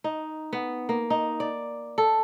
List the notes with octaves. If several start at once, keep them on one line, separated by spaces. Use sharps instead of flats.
D#4
B3
A#3
D#4
D5
A4